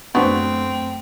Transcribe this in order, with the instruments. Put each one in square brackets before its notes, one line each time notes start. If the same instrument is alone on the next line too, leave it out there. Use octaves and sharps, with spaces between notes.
[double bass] F#2 A3 [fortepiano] B3 D4 C5 [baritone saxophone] C4 [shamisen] F#4